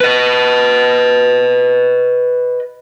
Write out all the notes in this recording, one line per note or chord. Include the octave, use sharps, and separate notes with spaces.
B4 D#5